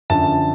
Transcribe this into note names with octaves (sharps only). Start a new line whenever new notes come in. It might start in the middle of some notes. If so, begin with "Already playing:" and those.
F#2 D3 F3 A5